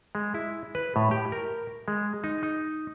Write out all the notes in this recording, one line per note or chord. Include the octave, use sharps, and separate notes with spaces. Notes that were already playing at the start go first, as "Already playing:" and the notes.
G#3
E4
B4
A2
G4
A#4
G#3
D#4
D#4